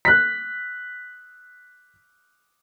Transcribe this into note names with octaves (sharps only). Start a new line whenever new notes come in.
F#6 B6